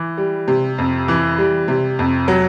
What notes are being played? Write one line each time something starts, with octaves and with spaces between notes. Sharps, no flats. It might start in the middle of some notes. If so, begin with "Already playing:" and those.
Already playing: E3
G3
C3
F2
E3
G3
C3
F2
F#3